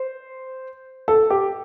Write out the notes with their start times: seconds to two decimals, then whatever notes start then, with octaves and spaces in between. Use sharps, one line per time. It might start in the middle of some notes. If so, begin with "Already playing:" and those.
Already playing: C5
1.08 A4
1.30 G4